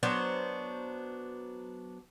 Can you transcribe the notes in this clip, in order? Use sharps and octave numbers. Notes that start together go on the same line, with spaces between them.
F#3 B3 D4 C5